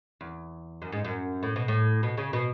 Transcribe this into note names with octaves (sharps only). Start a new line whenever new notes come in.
E2
F#2
G#2
F#2
A2
B2
A2
B2
C#3
B2